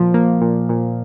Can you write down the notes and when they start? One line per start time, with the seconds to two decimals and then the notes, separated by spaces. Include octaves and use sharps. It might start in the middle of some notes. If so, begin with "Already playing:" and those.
Already playing: A#2 F3
0.14 A#3
0.41 A#2
0.69 A#2